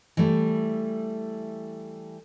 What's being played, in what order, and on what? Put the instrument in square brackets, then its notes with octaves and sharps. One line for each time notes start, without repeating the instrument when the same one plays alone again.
[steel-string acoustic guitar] E3 G3 A3